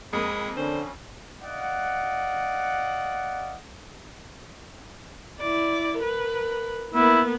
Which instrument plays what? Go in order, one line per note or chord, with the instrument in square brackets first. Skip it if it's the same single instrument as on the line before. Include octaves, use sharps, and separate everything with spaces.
[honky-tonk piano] F2 A#3 [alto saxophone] G#3 [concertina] B5 D#6
[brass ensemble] D3 [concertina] C#4 [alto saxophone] C5
[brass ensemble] D5 D#5 F5 F#5
[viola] E4 D5
A#4 B4
[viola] A#3 B3 [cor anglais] E4